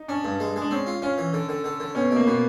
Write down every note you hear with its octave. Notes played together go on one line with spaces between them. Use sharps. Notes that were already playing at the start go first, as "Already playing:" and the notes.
Already playing: D#4
C#4 D4
G2
G#3
G#3
D4
C4 C#4
F4
C#4 F4
E3
D3
D3
D3
D3
B2 C#4
B2
A#3
B2 B3